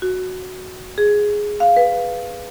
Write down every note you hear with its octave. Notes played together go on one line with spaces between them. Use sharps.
F#4
G#4
F5
B4